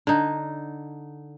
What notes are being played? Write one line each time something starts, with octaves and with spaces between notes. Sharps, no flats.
D3 D#4